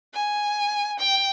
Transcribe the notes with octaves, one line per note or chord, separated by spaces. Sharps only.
G#5
G5